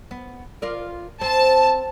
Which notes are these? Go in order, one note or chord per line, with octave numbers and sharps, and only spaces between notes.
B3
F4 A#4 D5
C4 A5